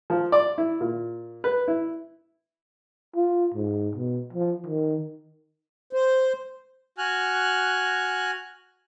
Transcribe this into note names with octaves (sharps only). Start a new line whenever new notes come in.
F3
D5
E4
A#2
B4
E4
F4
G#2
B2
F3
D#3
C5
F#4 G#5 F6 F#6